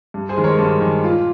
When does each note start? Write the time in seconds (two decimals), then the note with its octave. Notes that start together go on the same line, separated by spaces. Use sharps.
0.14 G2
0.29 G#4 C5
0.37 D#3 G#3
0.44 A#4 C#5
0.59 G2 G4
0.81 D#3 G#3
1.04 A#2 F4